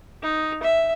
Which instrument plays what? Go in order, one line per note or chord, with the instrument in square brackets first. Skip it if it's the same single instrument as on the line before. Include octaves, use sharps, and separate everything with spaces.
[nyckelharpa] D#4
E5